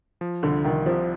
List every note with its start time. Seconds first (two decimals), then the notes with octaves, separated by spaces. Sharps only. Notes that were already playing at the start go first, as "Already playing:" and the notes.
0.21 F3
0.43 C2 D3
0.64 C2 D#3
0.86 C3 F3